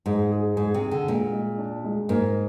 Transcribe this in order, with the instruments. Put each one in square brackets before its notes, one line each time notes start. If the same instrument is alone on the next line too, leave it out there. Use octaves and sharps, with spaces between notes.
[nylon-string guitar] G#2 [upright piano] G#4
[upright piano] G#4
[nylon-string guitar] G#2 [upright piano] G#4
[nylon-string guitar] C3
[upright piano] G#4
[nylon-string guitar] D3
[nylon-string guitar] A#2 [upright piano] G#3
[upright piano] G#3
D4
G#3
[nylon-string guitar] G#2 [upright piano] A#3